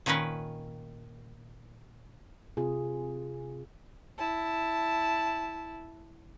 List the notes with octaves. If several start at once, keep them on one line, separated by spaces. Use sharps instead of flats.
A#2 D#3 C#4 A#4 B4
C3 F4 G#4
E4 A5